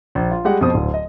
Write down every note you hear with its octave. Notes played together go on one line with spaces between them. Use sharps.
A#1
F4
G3 G#3 G4 F#5
F2 B2 C5 D#6
D1
D#5